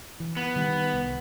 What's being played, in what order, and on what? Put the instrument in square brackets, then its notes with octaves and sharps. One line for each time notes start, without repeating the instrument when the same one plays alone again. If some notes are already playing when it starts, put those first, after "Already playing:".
[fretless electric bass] E3
[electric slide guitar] B3
[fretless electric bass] D#3 G3
C2